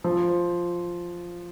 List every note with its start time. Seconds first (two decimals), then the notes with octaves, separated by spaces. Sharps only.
0.04 F3